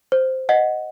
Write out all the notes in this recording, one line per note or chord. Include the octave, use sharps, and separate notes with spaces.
C5
D#5 F#5